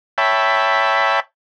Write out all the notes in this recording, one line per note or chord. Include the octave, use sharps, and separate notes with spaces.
C#5 E5 G5 A5 B5